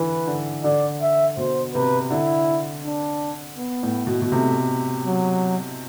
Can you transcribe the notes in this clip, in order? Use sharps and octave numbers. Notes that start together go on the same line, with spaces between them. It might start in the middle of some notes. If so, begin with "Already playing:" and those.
Already playing: D3 E3 B4
D3
D3 D5
E5
B2 C5
C3 B4
D3 E4
D4
B3
A2
B2
B2
C3 A3
F#3